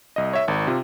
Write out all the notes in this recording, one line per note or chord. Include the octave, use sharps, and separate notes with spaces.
C2 D#5
C#5 E5
G#1
C3 F4